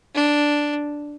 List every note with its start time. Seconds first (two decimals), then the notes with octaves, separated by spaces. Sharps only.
0.15 D4